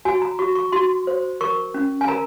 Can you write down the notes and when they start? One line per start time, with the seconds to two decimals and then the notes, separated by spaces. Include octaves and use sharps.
0.05 F#4 G#5
0.22 A#5
0.39 F#4 C#6
0.55 C#6
0.72 F#4 C6
1.07 C5
1.41 A#4 C#6
1.74 C#4
2.01 G#5
2.08 A#4 A#5